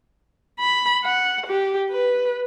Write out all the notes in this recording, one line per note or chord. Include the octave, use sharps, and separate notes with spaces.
B5
F#5
G4
B4